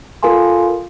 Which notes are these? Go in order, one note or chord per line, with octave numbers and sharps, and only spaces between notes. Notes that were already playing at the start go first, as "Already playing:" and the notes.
F4 A4 A#4 F5 G#5 C6